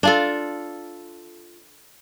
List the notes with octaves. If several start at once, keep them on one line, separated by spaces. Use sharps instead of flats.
D4 F4 A4